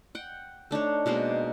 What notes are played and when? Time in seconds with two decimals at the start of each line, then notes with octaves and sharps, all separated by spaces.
0.15 F#5 G5
0.71 A3 D4 D#4 C#5
1.06 B2 G#3 A#3 C5